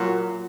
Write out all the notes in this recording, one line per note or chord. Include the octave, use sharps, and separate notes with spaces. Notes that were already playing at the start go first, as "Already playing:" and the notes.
Already playing: A#2 F#3